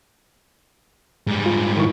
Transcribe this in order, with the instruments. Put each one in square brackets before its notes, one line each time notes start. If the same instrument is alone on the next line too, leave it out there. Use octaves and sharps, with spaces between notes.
[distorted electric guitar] G#2 G3
[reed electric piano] F4
D#3 E4 C#6